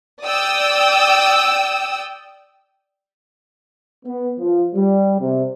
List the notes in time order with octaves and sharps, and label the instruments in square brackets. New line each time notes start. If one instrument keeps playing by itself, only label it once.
[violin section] D5 G5 D#6 E6
[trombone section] B3
F3
G3
C3